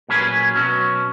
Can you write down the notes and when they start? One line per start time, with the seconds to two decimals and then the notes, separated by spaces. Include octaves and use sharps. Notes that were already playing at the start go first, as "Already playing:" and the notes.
0.08 A#2 F#3 C#4 G#4 B4
0.55 B2 F#3 C#4